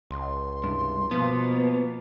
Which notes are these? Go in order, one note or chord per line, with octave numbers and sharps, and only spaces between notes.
C#2 C6
C2 G2
B2 F3 A#3 B3